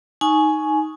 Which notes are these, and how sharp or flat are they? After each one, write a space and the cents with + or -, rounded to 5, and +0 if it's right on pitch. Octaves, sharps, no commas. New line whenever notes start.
D#4 +0 G#5 +15 C#6 +0